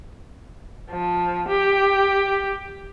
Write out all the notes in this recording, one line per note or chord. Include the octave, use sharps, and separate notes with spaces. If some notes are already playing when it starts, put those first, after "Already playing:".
F3
G4